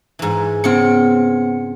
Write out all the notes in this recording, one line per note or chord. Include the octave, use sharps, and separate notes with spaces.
G#2 E3
C#3 B3 C4 C#7